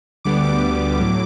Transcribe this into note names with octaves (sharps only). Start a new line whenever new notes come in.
D2 D3 G3 B3 D6
D6
A2 F#3